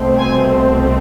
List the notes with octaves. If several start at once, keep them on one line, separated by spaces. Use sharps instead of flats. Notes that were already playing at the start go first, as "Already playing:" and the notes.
Already playing: C2 B2 A3 C4
G#5